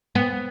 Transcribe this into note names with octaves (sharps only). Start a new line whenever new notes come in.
B3